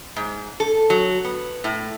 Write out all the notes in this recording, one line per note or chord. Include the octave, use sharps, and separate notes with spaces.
G#2
A4
F#3
B3
A2